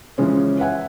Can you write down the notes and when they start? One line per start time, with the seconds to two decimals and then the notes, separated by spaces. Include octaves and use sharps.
0.18 C#3 E3 F3 G#3 C#4
0.59 B4 E5 F#5 G#5